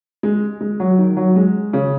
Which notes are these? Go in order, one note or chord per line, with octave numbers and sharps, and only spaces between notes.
G#3
G#3
F#3
D#3
F#3
G#3
C#3